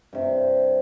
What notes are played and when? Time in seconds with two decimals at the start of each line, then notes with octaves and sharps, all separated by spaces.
0.13 G2 C3